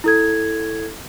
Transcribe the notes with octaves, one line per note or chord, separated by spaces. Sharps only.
E4 A4 G#6